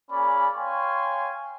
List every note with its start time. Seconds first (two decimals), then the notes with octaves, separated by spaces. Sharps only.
0.10 A#3 C#4 G#4 D5 B5
0.56 C#5 F5 G5 G#5 C6 C#6